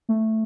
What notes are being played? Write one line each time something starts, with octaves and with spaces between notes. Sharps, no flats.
A3